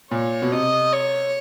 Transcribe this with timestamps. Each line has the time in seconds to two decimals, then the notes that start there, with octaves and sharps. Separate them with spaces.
0.11 A#2 C#5
0.42 B2
0.52 C3 D#5
0.93 C#5